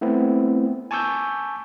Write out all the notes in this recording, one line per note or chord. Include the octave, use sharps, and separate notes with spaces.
A3 B3 C4 E4
G#5 A5 C#6 D6 E6 G6